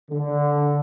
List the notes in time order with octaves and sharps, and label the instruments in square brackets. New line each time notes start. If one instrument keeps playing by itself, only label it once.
[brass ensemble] D3